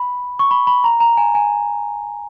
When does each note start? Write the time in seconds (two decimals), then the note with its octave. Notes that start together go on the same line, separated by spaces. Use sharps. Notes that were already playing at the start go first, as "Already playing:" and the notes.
Already playing: B5
0.39 C#6
0.51 B5
0.67 B5
0.84 A#5
1.00 A#5
1.17 G#5
1.35 G#5